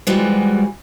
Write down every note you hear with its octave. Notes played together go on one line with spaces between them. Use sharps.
E3 F3 G3 G#3 F#4